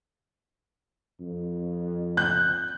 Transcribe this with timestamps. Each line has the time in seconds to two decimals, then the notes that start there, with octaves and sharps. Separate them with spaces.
1.21 F2
2.17 F#6 G6